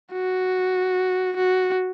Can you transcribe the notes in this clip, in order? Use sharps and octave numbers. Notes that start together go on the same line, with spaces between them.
F#4
F#4